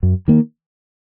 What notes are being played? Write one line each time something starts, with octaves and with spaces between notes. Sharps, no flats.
F#2
D#3 A#3